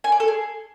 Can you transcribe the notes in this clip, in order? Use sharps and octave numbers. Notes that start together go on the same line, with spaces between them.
G#5
D5
A4
G#4